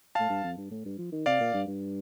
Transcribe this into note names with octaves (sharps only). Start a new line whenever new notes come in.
A2 F5 A5
G2
F2
G2
A2
G2
F3
D#3
C3 D5 F5
A#2
G2
G2